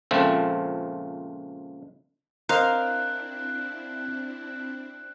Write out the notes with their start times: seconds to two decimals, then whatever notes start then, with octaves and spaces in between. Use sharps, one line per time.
0.11 C#2 A#2 F3 A3 C4
2.49 C4 D4 E4 A#4 C5 D#5 F5 F#6